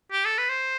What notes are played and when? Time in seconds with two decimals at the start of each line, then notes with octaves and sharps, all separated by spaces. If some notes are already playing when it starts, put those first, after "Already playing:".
0.12 G4
0.25 A4
0.38 B4
0.49 C5